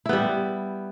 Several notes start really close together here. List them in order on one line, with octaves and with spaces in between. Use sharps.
E4 B3 G3